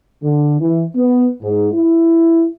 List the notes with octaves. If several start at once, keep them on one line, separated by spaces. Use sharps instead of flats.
D3
E3
B3
G#2
E4